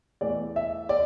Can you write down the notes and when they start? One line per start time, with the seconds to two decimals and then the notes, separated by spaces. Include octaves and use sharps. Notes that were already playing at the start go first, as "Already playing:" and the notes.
0.21 E2 E3 A3 D5
0.56 E5
0.89 D5